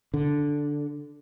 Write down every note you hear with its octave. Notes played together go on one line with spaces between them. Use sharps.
D3